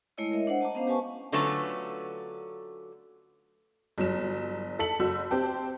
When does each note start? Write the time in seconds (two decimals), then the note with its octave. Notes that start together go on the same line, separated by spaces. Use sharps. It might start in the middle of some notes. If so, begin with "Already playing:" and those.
0.18 G#3 A3 E4 C#5 D#5 E6
0.31 A#4 C#5 D#5 E5
0.47 D4 C5 F#5
0.60 D#5 A5 A#5 D6
0.75 B3 C#4 C5 F5
0.87 G4 B4 G#5 A5 C#6 D6
1.32 D3 F#3 A3 C#4 F4 B4
3.98 G1 F#3 E7
4.79 A4 A5 B6 C#7 F#7
5.00 F#1 F#4 E6
5.31 C4 G4 G5 A5